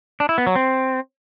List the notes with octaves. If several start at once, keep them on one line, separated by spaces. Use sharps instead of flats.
D4
E4
B3
F#3
C4